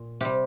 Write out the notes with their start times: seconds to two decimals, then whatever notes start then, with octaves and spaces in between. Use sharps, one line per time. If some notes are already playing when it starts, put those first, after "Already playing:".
Already playing: A#2
0.21 C3 G3 G4